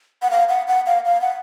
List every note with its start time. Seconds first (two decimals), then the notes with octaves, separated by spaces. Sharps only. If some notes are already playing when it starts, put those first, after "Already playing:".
0.22 F#5
0.31 F5
0.49 F#5
0.68 F#5
0.86 F5
1.05 F5
1.21 F#5